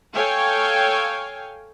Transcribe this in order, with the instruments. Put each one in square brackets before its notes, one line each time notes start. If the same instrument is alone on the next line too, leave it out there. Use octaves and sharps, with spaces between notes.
[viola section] A4 C#5 F5 G5 G#5